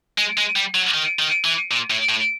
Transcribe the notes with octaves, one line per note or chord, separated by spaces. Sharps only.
G#3
G#3
G3
F#3
D#3
D#3
E3
A#2
A2
A2